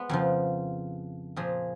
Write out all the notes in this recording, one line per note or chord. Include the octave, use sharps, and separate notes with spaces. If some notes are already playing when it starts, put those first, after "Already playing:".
Already playing: G#3 B3
F2 C#3 F3
A#2 F3 G#4